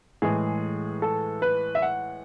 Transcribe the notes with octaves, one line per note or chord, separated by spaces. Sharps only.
A2 E3 G#3 G#4
A4
B4
E5
F#5